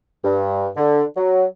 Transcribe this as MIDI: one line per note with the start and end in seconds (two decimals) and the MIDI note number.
0.24 0.68 43
0.77 1.02 50
1.17 1.45 54